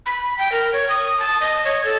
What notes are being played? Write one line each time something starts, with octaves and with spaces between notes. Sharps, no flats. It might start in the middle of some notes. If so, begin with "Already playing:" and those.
B5
G5
A#4
C#5
D#6
A5
D#5
C#5
A4